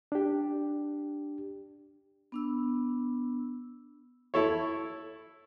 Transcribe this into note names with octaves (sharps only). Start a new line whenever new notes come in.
D4 G4
B3 D4 E6
E4 A4 C#5